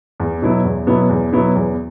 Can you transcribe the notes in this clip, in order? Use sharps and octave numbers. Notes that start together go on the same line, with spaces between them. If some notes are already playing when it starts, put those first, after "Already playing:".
E2
B2 F#3 B3 E4
E2
B2 F#3 B3 E4
E2
B2 F#3 B3 E4
E2